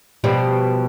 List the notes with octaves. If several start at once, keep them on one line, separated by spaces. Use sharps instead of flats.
B2 F3 G3